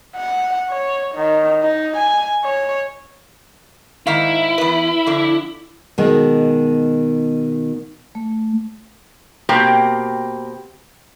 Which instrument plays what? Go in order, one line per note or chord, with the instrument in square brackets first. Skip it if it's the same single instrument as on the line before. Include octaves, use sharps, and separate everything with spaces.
[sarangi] F#5
C#5
D#3
D#4
G#5
C#5
[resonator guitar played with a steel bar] G#2 D#3 F5 [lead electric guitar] E4
[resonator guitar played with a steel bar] E2 B4
F2 D3
[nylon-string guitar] B2 D#3 G#3
[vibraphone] A3
[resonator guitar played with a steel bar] B2 A#3 C4 G4 G5